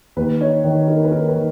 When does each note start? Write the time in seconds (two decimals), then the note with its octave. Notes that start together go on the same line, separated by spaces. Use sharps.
0.16 D#2 B4
0.41 D#4 C#5
0.64 D#3 C#5
0.88 D#4 A#4
1.04 B4
1.12 D#4 A#4
1.28 B4
1.35 D#3